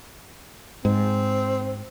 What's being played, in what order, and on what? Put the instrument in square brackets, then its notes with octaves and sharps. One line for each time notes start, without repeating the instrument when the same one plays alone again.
[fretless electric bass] G#2 [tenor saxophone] C4